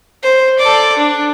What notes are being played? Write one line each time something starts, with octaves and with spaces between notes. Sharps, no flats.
C5
A4 D5
D4